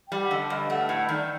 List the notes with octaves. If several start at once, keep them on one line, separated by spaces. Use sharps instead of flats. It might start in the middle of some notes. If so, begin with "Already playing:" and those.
G3 G5
F#5
D3 D#5
G2
A3 F#5
G5
A2 F#5
D#5
D#3 D5